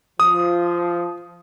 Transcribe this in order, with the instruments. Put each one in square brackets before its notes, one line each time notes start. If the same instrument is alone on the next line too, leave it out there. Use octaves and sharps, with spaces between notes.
[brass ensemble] F3 [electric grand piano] D#6